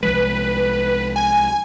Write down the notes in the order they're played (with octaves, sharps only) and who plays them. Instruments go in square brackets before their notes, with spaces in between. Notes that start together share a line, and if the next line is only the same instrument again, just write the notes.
[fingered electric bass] C2 F3 G#3 [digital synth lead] B4
[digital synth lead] G#5